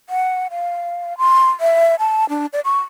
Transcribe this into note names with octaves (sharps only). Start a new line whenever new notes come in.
F#5
F5
C6
E5
A5
D4
D5
C#6